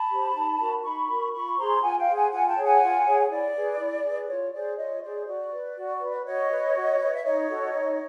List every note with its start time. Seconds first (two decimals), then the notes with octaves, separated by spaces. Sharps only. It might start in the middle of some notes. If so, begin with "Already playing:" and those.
Already playing: A5 B5
0.10 G4 C5
0.34 D#4
0.59 F#4 A#4
0.84 D#4 B5 C#6
1.09 F#4 A#4
1.33 F4 B5 C#6
1.58 G#4 C5 A#5 C6
1.82 F4 F#5 G#5
1.99 F5 G5
2.07 G#4 C5
2.15 F#5 G#5
2.31 F4 F#5 G#5
2.47 G5 A5
2.56 G#4 C#5
2.64 F#5 G#5
2.81 F4
3.05 G#4 C#5
3.30 E4 D5
3.54 G#4 B4
3.79 E4
4.04 G#4 B4
4.28 F4 C#5
4.53 G#4 C5 D5
4.77 F4 C#5 D#5
5.02 G#4 C5 D5
5.26 F#4 D5
5.52 B4
5.76 F#4
6.00 B4
6.25 F#4 C#5 D#5
6.50 B4
6.75 F#4
6.99 B4
7.14 E5
7.24 D#4 C#5 D#5
7.48 F#4 A4
7.73 D#4